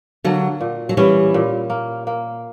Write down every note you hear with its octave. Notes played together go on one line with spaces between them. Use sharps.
D3 F#3 A#3
A#2
F#3
E3 G3 C#4
A#2
A#3
A#3